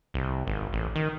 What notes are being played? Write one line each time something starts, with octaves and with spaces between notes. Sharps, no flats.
C2
G#1
A1
D#3